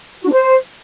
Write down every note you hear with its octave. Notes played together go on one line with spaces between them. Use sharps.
F#4
D4
C5